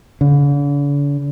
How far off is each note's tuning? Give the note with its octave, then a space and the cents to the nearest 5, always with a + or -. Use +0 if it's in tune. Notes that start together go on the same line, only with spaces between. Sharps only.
D3 -45